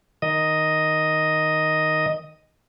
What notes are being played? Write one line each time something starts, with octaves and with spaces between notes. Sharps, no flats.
D#3 D#5